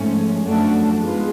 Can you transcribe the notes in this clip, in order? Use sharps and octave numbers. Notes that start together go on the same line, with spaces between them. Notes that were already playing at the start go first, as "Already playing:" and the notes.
Already playing: G#2 F3 A3 C#4
F#2 F3 A3 D4 F#4
G#2 G#3 B3 F4